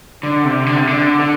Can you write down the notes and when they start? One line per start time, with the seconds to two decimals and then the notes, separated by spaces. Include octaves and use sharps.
0.23 D3
0.45 C3
0.66 D3
0.80 C3
0.87 D3
1.19 D3